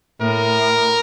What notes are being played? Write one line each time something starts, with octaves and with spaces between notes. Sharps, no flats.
A2 A#4